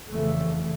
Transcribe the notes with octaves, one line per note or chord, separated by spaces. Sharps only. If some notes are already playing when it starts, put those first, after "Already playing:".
F1 E2 C#3 E3 A3